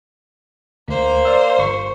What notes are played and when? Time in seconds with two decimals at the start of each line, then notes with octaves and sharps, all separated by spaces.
0.88 D2 A#3 C5
1.25 D5 F5 E6
1.59 G1 C#6